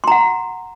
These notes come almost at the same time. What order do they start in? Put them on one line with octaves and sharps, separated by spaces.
C6 A#5 F#5